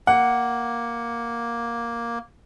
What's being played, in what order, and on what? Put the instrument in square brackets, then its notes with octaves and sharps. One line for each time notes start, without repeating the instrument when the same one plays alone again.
[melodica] A#3 [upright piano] F#5